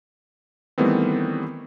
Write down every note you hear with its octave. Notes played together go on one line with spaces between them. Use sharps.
D#3 E3 G3 A3 B3 C4